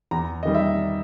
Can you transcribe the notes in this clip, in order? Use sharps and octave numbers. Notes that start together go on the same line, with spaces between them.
E2 A#5
D#3 G3 D#5
E5